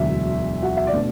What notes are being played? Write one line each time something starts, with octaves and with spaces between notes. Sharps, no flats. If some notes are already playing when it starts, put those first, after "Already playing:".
Already playing: E1 D2 D3 F#3 E5
F#4 F#5
E5
D5
B2 A3 D4